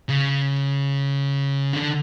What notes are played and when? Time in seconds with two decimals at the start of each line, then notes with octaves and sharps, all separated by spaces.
0.09 C#3
1.73 D3